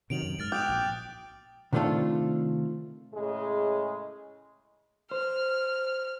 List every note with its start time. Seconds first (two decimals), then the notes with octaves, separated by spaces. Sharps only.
0.10 C3 D#3 F#3 D7 F7 F#7
0.23 F#2
0.39 G#2 F6 A6 D7
0.52 G5 D6 D#6 F#6
0.69 A#1
1.73 C3 D#3 A3 D4 F4 A4
3.13 A2 C#3 G#3 G#4
5.11 C5 F6